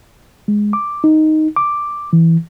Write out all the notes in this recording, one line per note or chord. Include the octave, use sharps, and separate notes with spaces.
G#3
D6
D#4
D6
E3